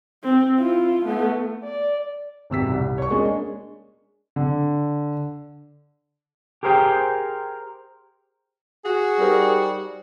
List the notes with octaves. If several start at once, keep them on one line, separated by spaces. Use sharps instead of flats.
C4
E4 F4
A3 B3
D5
G#1 C3 E6 B6
C2
C#5 C#6
G#3 A#3 C#4 D4 G#4
D3
G4 G#4 A#4 C5 E5 G5
F#4 G#4
G3 D#4 A#4 C5